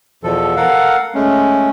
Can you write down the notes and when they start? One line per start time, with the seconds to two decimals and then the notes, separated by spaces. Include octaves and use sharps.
0.24 E2 B2 F3 A4
0.56 A4 A#4 F5 F#5
1.15 G#3 A3 C#4